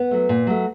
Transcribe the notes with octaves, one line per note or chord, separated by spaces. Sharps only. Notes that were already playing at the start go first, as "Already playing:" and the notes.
Already playing: B3
F#3 A3
A#2
F#3 A3